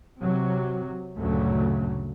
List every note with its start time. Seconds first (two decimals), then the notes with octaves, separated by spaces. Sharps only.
0.21 C3 F#3
1.18 D2 G2 A#2 C#3 F#3 A3